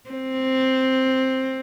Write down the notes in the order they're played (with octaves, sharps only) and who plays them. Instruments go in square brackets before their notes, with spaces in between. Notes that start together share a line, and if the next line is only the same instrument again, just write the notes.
[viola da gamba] C4